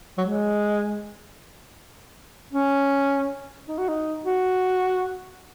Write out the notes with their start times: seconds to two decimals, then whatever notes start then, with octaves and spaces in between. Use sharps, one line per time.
0.18 F#3
0.21 G#3
2.53 C#4
3.68 D#4
3.78 F#4
3.88 D#4
4.25 F#4